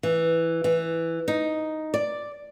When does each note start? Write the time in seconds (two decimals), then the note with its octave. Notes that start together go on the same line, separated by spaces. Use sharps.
0.03 E3
0.64 E3
1.28 D#4
1.94 D5